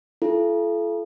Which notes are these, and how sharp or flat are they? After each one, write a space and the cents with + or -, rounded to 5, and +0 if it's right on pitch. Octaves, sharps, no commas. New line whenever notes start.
F4 -45 A4 -30